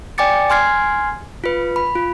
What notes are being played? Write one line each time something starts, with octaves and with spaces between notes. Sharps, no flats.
D5 G5 G#5 D6 A6 C#7
G#5 C6 F6 G#6 C7
F4 B4
B5
F4